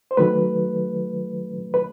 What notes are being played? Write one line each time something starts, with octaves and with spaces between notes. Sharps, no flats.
C5
D#3 F#3 A3 B4
B4